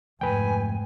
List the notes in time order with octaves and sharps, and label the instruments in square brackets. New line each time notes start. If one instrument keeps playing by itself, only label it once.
[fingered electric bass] F2 F3 A3 [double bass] G#2 [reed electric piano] B4 G5 [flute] G#5